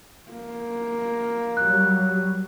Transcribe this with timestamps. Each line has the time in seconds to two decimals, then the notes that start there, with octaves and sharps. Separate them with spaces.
0.31 A#3
1.57 F#3 G3 F#6